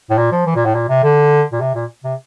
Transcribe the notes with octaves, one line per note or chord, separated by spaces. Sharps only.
A2
A#2
F3
E3
A#2
A2
A#2
C3
D3
A#2
C3
A#2
C3